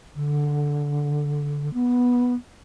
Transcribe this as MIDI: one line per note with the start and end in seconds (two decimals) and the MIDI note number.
0.15 1.72 50
1.74 2.34 59